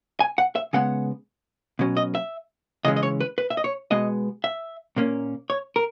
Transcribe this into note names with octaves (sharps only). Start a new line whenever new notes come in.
G#5
F#5
E5
C#3 G#3 B3 F#5
B2 F#3 C#4
D#5
E5
C#3 E3 G#3 C#4 D#5
D#5
C#5
B4
B4
E5
D#5
C#5
B2 G#3 B3 D#5
E5
A#2 A#3 C#4
C#5
A#4